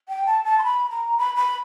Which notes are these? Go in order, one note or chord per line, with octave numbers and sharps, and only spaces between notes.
G5
A5
A5
C6
B5
A#5
B5
B5